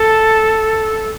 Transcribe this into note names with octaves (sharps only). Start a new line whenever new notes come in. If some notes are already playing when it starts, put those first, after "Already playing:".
Already playing: A4